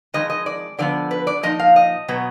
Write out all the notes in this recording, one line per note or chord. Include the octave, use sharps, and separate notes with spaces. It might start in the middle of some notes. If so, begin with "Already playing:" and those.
F2 D#3 G#3 D#5
D#5
D5
D3 F3 B3 D5
B4
D5
A#2 F3 D#4 D#5
F5
D#5
B2 F#3 B3